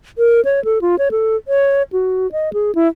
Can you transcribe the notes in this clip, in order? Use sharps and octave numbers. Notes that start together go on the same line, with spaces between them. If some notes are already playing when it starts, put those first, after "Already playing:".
A#4
C#5
A4
F4
C#5
A4
C#5
F#4
D#5
G#4
E4